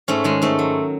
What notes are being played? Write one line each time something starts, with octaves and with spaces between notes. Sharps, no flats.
G#2 A3 C#4
D#3 G#3
G#2 A3
F#3